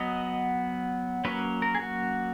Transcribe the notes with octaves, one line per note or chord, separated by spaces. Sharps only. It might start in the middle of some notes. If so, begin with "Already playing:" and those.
Already playing: F#3 B3 D#5
F#3 A#3 C#4 B4
A#4
G#4
F#4